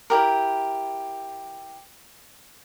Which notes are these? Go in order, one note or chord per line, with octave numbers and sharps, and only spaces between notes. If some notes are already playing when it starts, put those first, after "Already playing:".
E4 G4 A#4